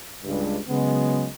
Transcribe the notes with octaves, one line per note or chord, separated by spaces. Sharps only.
C#2 G2
C#3 F#3 G#3 B3